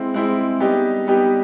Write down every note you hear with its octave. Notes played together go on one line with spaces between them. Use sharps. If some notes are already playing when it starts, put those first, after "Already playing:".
Already playing: G#3 C4 E4
G#3 C4 E4
G3 B3 D#4 G4
G3 B3 D#4 G4